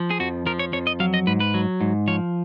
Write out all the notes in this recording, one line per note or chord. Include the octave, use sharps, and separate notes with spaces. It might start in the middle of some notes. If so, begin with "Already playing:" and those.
Already playing: F3
G#4
F2 F#4
F3 A#4
C#5
F2 C#5
D#5
F#3 F5
D#5
G#2 B4
B4
F#3
G#2
F3 C#5